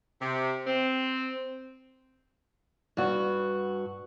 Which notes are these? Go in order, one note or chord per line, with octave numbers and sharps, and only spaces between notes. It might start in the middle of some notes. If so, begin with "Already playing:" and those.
C3
C4
G2 F#4